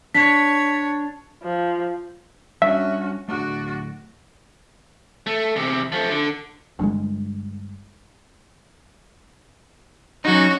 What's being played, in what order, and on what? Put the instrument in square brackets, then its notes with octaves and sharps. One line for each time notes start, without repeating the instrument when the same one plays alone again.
[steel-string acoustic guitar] D4 [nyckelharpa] C#5 [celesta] B6
[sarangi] F3
[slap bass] G3 D4 [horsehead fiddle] C#4 F#4 [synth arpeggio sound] E5
[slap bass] D1 A3 [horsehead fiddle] D4 F#4
[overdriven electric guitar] A3
E2 C3
F3 A3
D3
[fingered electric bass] G1 G2 D3 G#3
[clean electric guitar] F#3 D#4 [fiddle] C#4 F#4